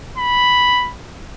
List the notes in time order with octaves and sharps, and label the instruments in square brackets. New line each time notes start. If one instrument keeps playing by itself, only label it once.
[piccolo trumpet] B5